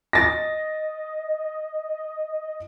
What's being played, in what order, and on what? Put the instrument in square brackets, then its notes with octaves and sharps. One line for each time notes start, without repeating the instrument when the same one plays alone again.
[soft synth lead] D#5 [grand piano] A6 A#6